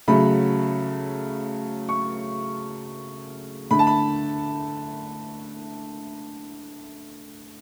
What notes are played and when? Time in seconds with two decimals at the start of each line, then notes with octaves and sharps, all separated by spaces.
0.08 C#3 F#3 A3 B5
1.89 C#6
3.71 D3 A3 B5
3.79 A5
3.87 B5